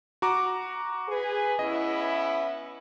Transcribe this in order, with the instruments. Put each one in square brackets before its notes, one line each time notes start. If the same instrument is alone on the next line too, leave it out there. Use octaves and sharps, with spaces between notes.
[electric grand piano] F#4 A#5 D6
[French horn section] G#4 B4
[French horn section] B3 C#4 E4 [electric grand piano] D#5